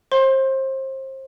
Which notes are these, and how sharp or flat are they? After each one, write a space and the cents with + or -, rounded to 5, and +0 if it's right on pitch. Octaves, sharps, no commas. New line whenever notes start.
C5 +30 C6 +20